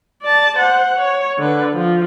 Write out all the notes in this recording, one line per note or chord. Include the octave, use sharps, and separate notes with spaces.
D5 A5
C5 F#5
C#5
D3 B4
F3